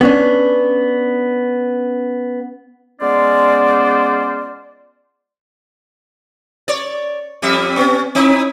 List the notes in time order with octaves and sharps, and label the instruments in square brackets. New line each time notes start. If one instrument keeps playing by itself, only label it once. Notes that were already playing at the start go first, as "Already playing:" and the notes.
[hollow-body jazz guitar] B3 C#4 D4
[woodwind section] G#3 B3 C#4 F4 C5 D5
[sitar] C#5 D5
F2 G3 E5
B3 C#4
C4 D#4 E4